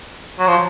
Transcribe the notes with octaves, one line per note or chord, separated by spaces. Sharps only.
F#3
F3